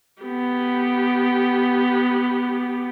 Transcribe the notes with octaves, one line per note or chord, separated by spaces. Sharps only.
B3 G4